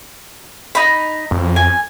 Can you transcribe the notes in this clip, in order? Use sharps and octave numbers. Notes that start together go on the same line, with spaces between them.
D#4 B5
F2
G#5